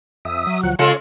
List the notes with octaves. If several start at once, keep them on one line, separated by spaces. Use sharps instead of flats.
F2 E5 D#6
F#3
D2 F3 F#5
C#3 G#3 F4 A4 C#5 C#6